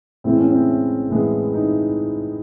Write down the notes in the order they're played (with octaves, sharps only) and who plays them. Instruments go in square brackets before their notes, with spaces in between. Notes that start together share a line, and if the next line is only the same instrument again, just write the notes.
[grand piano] A2 E3 G#3 B3 C4
C#4
C4
A2 E3 G#3 B3
D#4